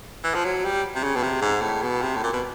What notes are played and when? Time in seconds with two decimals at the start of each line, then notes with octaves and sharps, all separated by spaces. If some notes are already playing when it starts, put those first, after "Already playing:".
0.24 E3
0.35 F3
0.45 F#3
0.65 G3
0.95 C3
1.03 C#3
1.16 B2
1.23 C3
1.42 G#2
1.62 A2
1.82 B2
2.02 C3
2.16 A2
2.23 A#2
2.33 B2